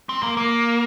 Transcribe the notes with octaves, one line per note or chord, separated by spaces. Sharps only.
C4
A#3
A#3